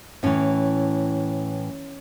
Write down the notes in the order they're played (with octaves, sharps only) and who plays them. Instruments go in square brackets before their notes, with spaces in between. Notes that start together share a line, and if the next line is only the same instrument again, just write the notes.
[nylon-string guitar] A2 E3 C#4